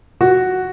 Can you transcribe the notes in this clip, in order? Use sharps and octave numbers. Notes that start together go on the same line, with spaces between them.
F#4